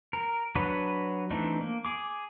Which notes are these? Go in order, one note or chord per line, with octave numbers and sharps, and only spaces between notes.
A#4
F#3 D4 F#4 B4
E3 A3 C4 D4 D#4
A#3
G#4 D6